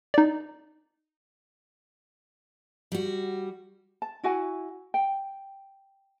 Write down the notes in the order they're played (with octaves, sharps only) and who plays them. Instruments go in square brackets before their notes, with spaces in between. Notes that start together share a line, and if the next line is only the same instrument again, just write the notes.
[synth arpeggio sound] D#4 D5
[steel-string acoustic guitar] G3 F#4
[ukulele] A5
E4 F#4 F#5 G#5
G5